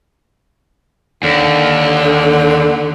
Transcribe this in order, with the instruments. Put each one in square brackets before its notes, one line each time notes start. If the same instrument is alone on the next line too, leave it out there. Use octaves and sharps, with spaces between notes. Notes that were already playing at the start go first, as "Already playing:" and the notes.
[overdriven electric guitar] D#2 [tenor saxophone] D3